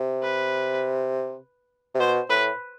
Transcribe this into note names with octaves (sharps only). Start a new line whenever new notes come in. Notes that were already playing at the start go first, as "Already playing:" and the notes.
Already playing: C3
B4
C3
B2 C5
A2 B4